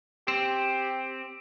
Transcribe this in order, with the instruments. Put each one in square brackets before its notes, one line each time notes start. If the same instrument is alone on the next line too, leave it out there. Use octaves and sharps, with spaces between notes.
[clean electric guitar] C4 [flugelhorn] G4